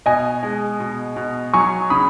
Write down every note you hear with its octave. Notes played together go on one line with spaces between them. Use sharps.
B2 D#5 G#5
G#3
B2
B2
F#3 G#5 C#6
C#3 B5 D#6